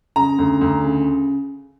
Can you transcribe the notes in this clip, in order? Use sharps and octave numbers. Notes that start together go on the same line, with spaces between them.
C#3 A#5
D2
D2
C#3